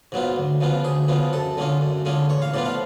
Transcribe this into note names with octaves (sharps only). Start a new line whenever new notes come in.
G#2 F#3 B3 F4
D2
C#3 F3 B3 F4
D2 G#4
C#3 F3 B3 F4
F#2 A4
D3 G#3 C#4 F4
F#2
D3 G#3 C#4 F4
A1 C#5
F5
A2 F3 B3 F4 D5
F5